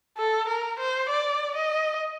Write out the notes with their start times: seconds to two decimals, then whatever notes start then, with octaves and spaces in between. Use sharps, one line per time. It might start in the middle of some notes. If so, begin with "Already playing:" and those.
0.17 A4
0.48 A#4
0.79 C5
1.09 D5
1.55 D#5